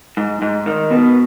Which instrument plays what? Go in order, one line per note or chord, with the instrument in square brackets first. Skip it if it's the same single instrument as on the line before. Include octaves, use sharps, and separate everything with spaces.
[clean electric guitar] G#2
G#2
D#3
[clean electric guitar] B2 [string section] B3